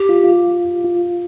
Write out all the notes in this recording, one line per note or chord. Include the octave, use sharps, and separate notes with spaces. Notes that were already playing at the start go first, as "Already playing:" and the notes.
Already playing: G4
F4
F4
F4